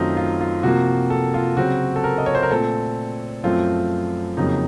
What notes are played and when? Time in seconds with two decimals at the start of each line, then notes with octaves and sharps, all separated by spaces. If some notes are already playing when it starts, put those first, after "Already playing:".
Already playing: F#2 D#3 F#3 A3 C4 D#4 F4
0.17 F4
0.41 F4
0.63 C3 F3 A#3 F#4
1.10 A4
1.34 F4
1.57 C#3 F#3 C4 F#4
1.96 A4
2.04 A#4
2.18 D#5
2.26 C#5
2.35 C5
2.42 A#4
2.51 A#2 A3 C4 A4
3.44 F#2 F3 A3 C4 F4
4.37 F2 C#3 F#3 A#3 D#4